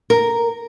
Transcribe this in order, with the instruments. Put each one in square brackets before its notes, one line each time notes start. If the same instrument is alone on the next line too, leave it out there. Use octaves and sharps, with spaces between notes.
[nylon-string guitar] A#4